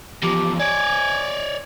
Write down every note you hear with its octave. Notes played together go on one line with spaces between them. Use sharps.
E2 F3 G4
C#5 D5 G#5